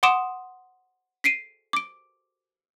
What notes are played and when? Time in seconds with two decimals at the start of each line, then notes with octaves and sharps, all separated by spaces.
0.03 F#5 C6 D6 D#6 D7 E7
1.24 B6 C7 D7 D#7
1.73 D6 D7